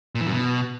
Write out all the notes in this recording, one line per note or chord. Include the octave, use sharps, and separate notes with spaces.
A#2
E3
F#2
B2